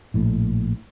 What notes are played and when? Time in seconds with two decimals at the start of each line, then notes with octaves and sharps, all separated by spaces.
0.14 A#1 A2